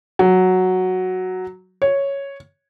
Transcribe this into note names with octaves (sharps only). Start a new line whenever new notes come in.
F#3
C#5